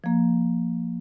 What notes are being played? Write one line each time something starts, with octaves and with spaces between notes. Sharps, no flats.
F3 A#3